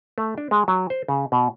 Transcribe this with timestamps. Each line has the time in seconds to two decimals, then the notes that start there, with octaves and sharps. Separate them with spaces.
0.18 A3
0.38 D4
0.51 G#3
0.68 F#3
0.90 C5
1.08 C#3
1.32 B2